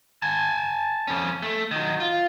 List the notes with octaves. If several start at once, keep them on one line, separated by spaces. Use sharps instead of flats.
G#5 A5
F2 C#4
A3
D#3 F#3
F4